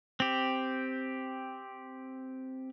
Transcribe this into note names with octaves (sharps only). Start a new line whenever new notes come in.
C4 G4